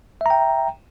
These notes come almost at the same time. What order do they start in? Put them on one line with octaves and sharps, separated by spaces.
E5 A#5 G5